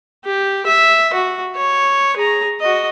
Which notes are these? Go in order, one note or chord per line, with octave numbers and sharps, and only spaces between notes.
G4
E5
F#4
C#5
G#4 A#5
F#4 D#5